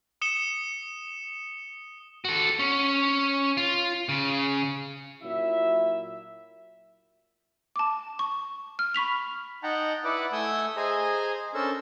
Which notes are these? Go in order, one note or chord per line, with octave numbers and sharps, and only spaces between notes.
D#6 C#7 E7 G7
F#4 A4
C#4
F4
C#3
A#2 F#3 E4 E5
A5 D6
C#6
F6
B5 C#6 B6 F7
D#4 F#5 G5 A5 A#5
E4 B4 D5 F#5 D6
A3 E5 G#5 D#6 E6 G6
G#4 C5 D#5 G#5 A#5
C#4 D4 A4 A#4 C5 E6